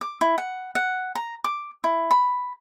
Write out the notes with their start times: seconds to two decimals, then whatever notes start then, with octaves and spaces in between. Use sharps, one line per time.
0.01 D6
0.21 E4
0.38 F#5
0.75 F#5
1.15 A#5
1.44 D6
1.84 E4
2.11 B5